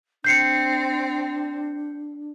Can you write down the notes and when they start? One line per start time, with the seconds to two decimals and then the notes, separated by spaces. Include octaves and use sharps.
0.24 C4 D4 G6 C7 C#7